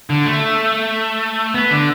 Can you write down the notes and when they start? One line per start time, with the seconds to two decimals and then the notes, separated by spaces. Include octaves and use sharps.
0.10 D3
0.26 A3
1.54 B3
1.71 D3